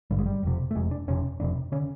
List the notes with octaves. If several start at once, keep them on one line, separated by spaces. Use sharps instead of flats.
G#1 G2 D3 G3
G#3
G3
F1 F2 C3
A3
F1 F2 C3 G#3
D4
F1 F2 C3 C#4
F1 F2 C3 D4
D3 C#4